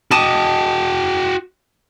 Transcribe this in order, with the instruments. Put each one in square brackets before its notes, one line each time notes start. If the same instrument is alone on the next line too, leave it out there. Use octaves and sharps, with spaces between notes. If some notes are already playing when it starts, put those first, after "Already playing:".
[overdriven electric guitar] F#4 G5 [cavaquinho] D#5 A5 D6